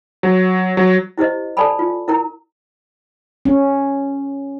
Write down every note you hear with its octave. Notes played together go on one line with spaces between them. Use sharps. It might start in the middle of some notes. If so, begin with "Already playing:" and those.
F#3
F#3
E4 G4 C5 D#5
A4 D5 G#5 A5 B5
F4
E4 A#4 A#5
C#4